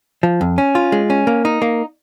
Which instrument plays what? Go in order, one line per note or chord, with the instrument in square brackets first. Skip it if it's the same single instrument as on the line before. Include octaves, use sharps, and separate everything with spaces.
[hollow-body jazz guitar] F3
F2
C#4
F4
G#3
C#4
A#3
D#4
A#3